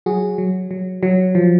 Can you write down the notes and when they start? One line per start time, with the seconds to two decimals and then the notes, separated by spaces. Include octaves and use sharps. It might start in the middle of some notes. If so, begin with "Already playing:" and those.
0.06 F#3 F#4 G#4
0.38 F#3
0.71 F#3
1.03 F#3
1.35 F3